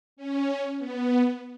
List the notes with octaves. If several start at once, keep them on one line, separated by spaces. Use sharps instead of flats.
C#4
B3